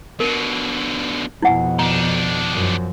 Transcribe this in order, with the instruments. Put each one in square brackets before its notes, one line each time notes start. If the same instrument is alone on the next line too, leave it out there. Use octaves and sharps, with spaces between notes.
[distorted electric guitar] B2 D3 [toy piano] A#4
[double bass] F2 B2 [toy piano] E4 F#5 G#5
[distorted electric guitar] D#3 D4 [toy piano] A#5
[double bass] F#2 F3